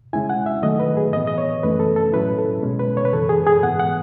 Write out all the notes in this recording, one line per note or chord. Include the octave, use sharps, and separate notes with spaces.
C#3 G#3 C#4 E4 G#5
F#5
E5
D#3 F#3 A3 D#5
B4
G#4
A2 E3 B3 D#5
D#5
C#5
F#2 E3 A3 C#4 B4
A4
A4
A2 F#3 C#4 E4 B4
A4
B2 G#3 C#4
B4
C#5
B4
F#2 C#3 E3 A4
G#4
G#4
G#2 E3 B3 F#5
F#5